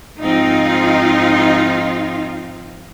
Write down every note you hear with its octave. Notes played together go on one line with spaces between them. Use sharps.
G#2 F3 C4 D#4 F4